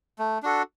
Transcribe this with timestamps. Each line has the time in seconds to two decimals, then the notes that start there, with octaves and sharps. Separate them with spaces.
0.19 A3
0.43 D4 F#4 A4